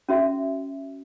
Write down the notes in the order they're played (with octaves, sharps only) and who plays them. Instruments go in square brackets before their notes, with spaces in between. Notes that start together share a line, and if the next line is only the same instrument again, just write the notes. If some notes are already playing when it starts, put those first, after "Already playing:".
[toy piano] C#4 F#4 E5